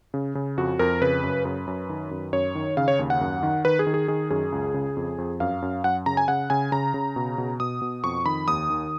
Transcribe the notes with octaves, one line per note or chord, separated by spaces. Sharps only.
C#3
C#3
F2 F#4
F2 A#4
C#3 B4
F#2
F#2 B4
F#2
D#3
F#2
F#2 C#5
D#3
C#3 F5
C#5
D#2
F#5
F#2
D#3
D#3 B4
G#4
D#3
G#4
D#3 G#4
F#2 G#4
C#2
C#3
F2
F2
F#2 F5
F#2
F#2 F#5
C#3 A#5
G#5
C#3 F#5
C#3 G#5
C#3 A#5
C#3
B2
B2
B2 D#6
B2
F2 C#6
D#3 B5
D#2 D#6
D#3